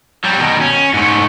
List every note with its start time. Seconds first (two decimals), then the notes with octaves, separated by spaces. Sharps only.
0.24 F#3 G3
0.38 B2 D#3
0.61 C#4
0.94 G#2 A3